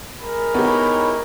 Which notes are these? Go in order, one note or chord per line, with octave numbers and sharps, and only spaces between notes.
G#3 A#4 B5
B3 D#4 E4 G4 C#5